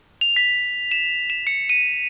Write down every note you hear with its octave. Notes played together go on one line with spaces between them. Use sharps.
F7
B6
E7
E7
C#7
D#7